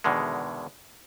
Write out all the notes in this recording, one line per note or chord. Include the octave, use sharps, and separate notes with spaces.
E2 B2 D3 D#3 G#3